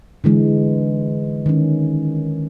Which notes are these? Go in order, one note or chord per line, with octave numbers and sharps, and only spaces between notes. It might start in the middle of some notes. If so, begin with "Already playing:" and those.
D3 E3 G#3
D#3 C#4